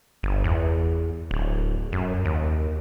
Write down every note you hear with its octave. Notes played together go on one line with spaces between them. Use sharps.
G1
E2
D1
F#2
D#2